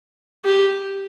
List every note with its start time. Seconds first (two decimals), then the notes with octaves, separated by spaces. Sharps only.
0.45 G4